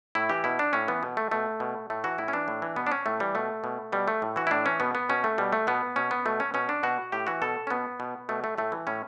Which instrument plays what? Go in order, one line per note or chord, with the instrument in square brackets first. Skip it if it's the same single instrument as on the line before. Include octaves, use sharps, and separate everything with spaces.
[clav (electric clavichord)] A2 E4
E3 G4
B2 E4
D4
A2 C#4
E3 B3
B2
A3
B2 A3
B2
A2 A3
E3 F#4
A2 E4
C#4
E3 D4
A2
E3
B2 B3
D4
C#4
A2 A3
E3 G3
B2 A3
B2
B2 G3
A3
A2
E3 F#4
E4
A2 D4
E3 C#4
B2 B3
B3
B2 C#4
A3
B2 G3
A3
B2 B3
B2 C#4
B3
B2 A3
C#4
B2 C#4
D4
B2 F#4
A2 G4
E3 F#4
B2 A4
C#4
B2 B3
B2
B2 A3
A3
A2 A3
E3
A2 C#4